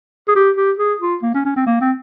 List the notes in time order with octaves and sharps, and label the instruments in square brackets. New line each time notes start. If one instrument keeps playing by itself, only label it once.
[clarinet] G#4
G4
G4
G#4
F4
A#3
C#4
C#4
C4
A#3
C4